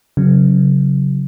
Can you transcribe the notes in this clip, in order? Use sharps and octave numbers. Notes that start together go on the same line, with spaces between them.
C#3 F#3